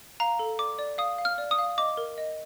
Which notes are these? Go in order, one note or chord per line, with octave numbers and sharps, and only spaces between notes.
F5 A#5
A4
D5 D6
D5
F5 D#6
F5
F6
D5
D#6
F5
D#5 D6
A#4
D#5